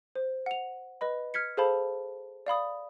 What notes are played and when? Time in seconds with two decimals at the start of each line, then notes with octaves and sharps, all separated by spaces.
0.15 C5
0.46 F#5 F7
1.01 B4 D#5 B5
1.34 F6 G#6 B6 C#7
1.57 G#4 A4 C5 F5 A5 B5
2.46 D5 F5 B5 D#6